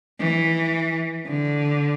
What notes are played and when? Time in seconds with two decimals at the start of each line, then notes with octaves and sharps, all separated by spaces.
0.19 E3
1.27 D3